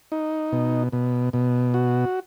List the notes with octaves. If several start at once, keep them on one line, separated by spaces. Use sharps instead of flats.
D#4
B2
B2
B2
F#4